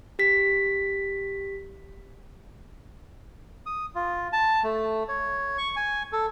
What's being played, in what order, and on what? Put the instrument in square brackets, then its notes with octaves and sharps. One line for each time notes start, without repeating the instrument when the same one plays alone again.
[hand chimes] G4 B6
[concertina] D#6
F4
A5
A3
C#5
C#6
G#5
A4